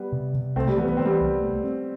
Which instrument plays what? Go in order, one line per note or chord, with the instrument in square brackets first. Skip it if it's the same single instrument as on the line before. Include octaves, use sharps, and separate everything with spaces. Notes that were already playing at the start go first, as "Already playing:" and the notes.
Already playing: [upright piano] G3 B3
[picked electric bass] C3
C3
[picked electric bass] C2 [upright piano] A3 C4
[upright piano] G3
[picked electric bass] E3 [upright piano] G3 B3
[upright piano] B3
[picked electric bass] E3 [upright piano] C4
[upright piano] G3 B3
[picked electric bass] C2
A3
C4